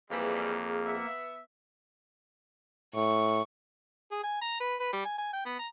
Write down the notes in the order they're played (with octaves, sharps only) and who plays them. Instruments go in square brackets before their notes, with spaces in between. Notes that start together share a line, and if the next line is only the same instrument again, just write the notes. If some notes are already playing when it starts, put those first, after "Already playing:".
[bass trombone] F2 [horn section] E3 G3 [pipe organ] A#3 [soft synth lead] G#4
[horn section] B3 E5
[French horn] A2 [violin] C#6
[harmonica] G#4
G#5
A#5
B4
B4
G3
G#5
G#5
G5
B3
A#5